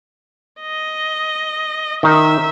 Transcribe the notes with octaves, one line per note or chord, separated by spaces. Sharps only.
D#5
D#3 D#4 E5